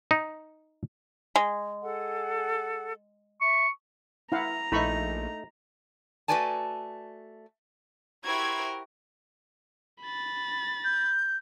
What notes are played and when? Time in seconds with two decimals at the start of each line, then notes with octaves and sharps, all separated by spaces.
0.11 D#4
1.36 G#3
1.82 G#4 A4 F#5
3.41 E5 C#6
4.32 E4 F5 F#5 A#5
4.72 A#1 A3 D#4 E4 B5 C#6
6.28 A3 F#4 B4 D5 G#5 A5
8.24 E4 F#4 G4 A#4 C5 G#6
10.01 B5 A6
10.84 G6